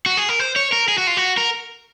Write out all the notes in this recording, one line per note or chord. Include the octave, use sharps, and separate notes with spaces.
F#4
G#4
A#4
C5
C#5
A#4
G#4
F#4
F4
F#4
A#4